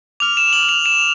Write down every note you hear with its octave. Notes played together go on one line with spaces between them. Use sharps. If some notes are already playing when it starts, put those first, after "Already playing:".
D6 F6 F7
E7
F#7
F7
E7